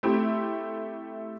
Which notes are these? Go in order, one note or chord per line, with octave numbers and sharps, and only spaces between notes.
A3 C4 E4 G4